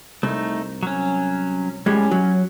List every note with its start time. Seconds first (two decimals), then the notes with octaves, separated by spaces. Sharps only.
0.23 C2 A3 D#4
0.83 F#3 C#4
1.86 A2 G3 G#3 C#4
2.11 F#3